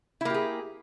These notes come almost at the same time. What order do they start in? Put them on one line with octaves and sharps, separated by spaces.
E4 A#3 G4 G#4